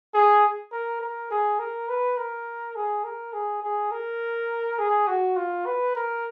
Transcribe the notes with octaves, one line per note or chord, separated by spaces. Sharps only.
G#4
A#4
A#4
G#4
A#4
B4
A#4
G#4
A#4
G#4
G#4
A#4
G#4
F#4
F4
B4
A#4